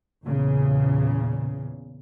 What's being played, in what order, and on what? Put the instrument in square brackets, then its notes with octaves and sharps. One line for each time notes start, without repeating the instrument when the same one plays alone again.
[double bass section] E2 A#2 C#3